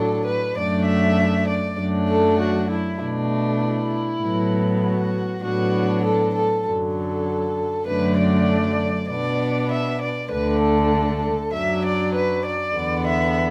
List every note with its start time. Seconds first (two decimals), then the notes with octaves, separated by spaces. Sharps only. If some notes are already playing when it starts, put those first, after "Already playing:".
Already playing: A2 F#3 D4 A4
0.26 B4
0.56 F#2 F#3 A3 D4 D5
0.86 E5
1.48 D5
1.78 F#2 F#3 A3 D4
2.08 A4
2.39 F#4
2.69 E4
3.00 B2 A3 D4
3.61 E4
4.22 A2 F#3 B3
4.82 F#4
5.43 A2 F#3 B3 D4 F#4
6.04 A4
6.35 A4
6.66 F#2 D3 F#3
6.96 A4
7.87 F#2 D3 F#3 A3 D4 B4
8.18 D5
9.09 B2 B3 D4 D5
9.71 E5
10.01 D5
10.31 D2 D3 A3 D4 B4
10.62 A4
11.53 F#2 F#3 D4 E5
11.84 D5
12.15 B4
12.45 D5
12.76 E2 D3 B3
13.06 E5